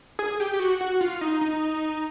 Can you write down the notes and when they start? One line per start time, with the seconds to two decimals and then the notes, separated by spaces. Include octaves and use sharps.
0.19 G#4
0.40 G4
0.53 G4
0.60 F#4
0.81 F#4
1.01 F4
1.21 D#4
1.41 D#4